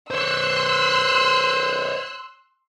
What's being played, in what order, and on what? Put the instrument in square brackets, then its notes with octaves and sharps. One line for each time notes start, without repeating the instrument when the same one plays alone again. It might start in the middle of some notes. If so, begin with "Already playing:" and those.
[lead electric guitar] C5 C#5 [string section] C6 E6 F#6